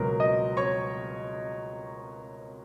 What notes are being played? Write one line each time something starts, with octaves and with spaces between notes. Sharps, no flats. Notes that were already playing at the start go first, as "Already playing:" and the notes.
Already playing: C#2 B2 F#3 A#4 A#5
D#5 D#6
C#5 C#6